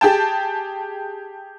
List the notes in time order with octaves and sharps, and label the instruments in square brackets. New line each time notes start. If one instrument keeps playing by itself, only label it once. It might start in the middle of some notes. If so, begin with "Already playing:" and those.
[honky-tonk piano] G4 G#4 G5 A5